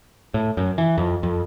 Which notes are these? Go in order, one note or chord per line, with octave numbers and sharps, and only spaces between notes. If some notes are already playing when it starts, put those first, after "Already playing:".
A2
F#2
E3
F2
F2